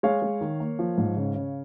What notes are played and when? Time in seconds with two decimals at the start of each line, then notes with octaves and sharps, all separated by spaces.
0.03 G#3 C#5 F5
0.22 G#3
0.41 D#3
0.60 A#3
0.79 F3
0.98 G#2
1.17 C#3
1.35 C#3